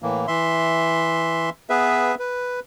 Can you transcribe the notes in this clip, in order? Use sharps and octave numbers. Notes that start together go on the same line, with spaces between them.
A2 E3 A#3
E3 E5 C6
B3 G#4 B4 E5
B4